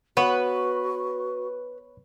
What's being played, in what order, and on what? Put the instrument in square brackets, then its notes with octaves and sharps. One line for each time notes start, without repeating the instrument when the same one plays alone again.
[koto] B3 [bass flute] F#4 [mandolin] B4 [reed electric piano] C#5 B5 C#6